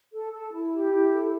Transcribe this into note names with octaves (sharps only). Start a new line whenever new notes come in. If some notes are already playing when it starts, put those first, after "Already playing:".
A4
A4
E4
G4
E4
A4